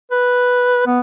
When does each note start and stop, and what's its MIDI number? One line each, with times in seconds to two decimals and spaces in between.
0.11 0.83 71
0.87 1.00 59